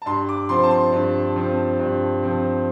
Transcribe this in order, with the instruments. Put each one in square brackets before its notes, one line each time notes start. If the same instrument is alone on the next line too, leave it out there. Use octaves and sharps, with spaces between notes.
[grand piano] A5
G2 C6
D6
F3 C4 C6
A5
C6
G2
F3 C4
G2
F3 C4